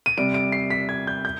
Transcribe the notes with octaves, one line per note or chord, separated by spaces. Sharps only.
D#7
C3 G3 D7
D7
C7
B6
G#6
G6
G6